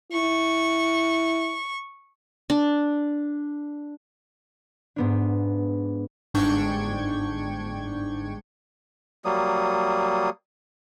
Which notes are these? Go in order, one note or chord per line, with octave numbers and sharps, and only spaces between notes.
E4 C#6
D4
G#2 B3 D4
G1 G#2 D4 G5 C#6 G#6
F#3 G3 A#3 D#6